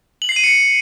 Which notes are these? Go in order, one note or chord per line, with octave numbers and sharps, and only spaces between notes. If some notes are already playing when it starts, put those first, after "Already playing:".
F#7
C7
D#7
C#7